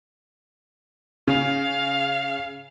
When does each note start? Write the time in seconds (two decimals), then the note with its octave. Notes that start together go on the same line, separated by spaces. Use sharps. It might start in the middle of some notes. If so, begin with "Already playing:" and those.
1.28 C#3 F5